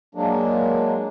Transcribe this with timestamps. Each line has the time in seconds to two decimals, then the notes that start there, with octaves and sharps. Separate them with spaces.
0.15 F#3 G#3 A#3 D4